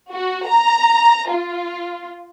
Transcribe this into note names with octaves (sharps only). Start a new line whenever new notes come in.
F#4
A#5
F4